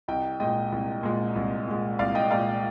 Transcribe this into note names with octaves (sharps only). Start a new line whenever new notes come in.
C2 D#5 G5
A#2 G#3 D#5 G5
C2
A#2 G#3
C2
A#2 G#3
C2 D5 F5
D#5 G5
A#2 G#3 D5 F5